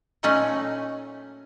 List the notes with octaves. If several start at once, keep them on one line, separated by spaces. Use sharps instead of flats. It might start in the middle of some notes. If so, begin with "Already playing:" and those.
A#2 F#3 A3 C#4 D#4 F#5